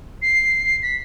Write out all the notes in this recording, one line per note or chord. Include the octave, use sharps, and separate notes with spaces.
C7
B6